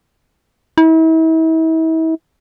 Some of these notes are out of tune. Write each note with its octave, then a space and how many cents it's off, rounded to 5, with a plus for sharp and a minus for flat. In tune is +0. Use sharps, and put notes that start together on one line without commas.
E4 -40